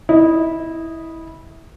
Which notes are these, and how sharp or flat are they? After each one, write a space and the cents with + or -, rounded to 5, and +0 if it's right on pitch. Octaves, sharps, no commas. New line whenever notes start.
E4 -15 D#5 +0